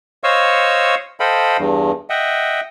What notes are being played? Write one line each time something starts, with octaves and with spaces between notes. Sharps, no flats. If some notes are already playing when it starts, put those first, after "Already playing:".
C5 C#5 D#5 F5 C#6 E6
A4 C5 D#5 F5 G5 B5
E2 G2
D#5 E5 F#5 G5